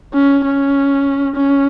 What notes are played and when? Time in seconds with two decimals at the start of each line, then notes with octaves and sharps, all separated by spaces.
0.14 C#4
0.45 C#4
1.36 C#4